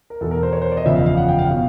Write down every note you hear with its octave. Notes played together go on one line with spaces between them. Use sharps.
A#4
E2 B2 A4
A#4
C5
C#5
C5
D5
D#5
F#1 E2 C#3 F3 E5
F5
F5
F#5
G5
F5
B2